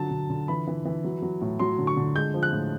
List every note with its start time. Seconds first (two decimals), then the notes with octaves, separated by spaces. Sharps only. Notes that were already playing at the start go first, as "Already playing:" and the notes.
Already playing: D3 F#3 A5
0.11 D3
0.30 D3
0.48 E3 B5
0.67 E3
0.85 E3
1.04 F#3
1.22 F#3
1.41 A2
1.59 F#3 C6
1.78 D3
1.87 C#6
1.97 D3
2.15 G#3 G6
2.34 F3
2.43 F#6
2.52 A2